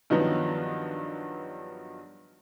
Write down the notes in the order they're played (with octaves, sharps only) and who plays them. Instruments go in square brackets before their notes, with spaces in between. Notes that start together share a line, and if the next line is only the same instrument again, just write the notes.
[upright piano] G2 D#3 F3 F#3 B3 D#4